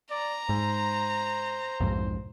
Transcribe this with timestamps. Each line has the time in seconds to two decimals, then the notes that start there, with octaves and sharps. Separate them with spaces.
0.11 D5 A#5
0.49 G#2 C5
1.80 B1 F2 G#2